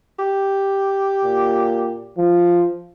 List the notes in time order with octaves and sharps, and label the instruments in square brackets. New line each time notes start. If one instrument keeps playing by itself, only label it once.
[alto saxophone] G4
[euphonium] A#2
F3